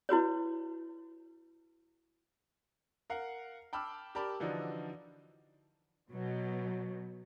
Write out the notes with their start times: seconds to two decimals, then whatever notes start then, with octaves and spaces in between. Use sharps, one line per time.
0.09 E4 F#4 B4 C#5
3.10 A#4 F5 F#5
3.73 G5 A5 B5 D6 E6 F6
4.15 G4 A#4 D5 A5 B5 D6
4.40 D3 E3 F3 D4 D#4 F#4
6.10 B2 F#3